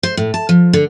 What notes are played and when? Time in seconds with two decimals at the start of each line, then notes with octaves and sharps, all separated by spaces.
0.03 C5
0.17 A2
0.34 A5
0.49 F3
0.73 D3